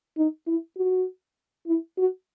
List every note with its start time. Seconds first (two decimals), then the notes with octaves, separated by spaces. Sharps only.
0.17 D#4
0.47 E4
0.77 F#4
1.67 E4
1.98 F#4